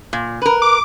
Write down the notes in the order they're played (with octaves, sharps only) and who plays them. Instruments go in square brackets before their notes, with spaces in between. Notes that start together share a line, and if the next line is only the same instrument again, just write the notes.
[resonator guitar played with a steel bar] A#2
A#4 B4
[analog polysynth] D6